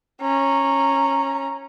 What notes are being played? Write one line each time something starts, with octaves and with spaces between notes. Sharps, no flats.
C#4 A#5